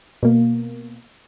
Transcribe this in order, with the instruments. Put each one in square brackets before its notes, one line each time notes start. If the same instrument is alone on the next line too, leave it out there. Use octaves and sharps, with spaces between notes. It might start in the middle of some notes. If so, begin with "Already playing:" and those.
[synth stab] B2 A#3